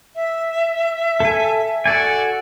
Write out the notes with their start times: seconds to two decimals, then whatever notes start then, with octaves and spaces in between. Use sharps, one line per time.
0.15 E5
1.20 A4 G#5
1.86 F#4 A4 D5 G#5